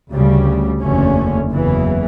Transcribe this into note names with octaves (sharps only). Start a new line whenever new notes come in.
D2 C#3 G3
F#1 E2 D3 A3 C#4
F#1 E2 C#3 E3